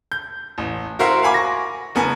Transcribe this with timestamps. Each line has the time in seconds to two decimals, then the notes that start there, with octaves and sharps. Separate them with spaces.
0.12 G6
0.58 A1
0.99 E4 F#4 A#4 C5 E5 F5
1.22 F5 F#5 G#5 B5 D6
1.34 C#6 A#6
1.95 F#1 B3 A#4 G#5